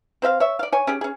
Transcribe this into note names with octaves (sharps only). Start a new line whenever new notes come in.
C4 C5 E5 F5
C#5 E5
D5 F5
C#5 G#5
C#4 G4 G#4
C#4 G#4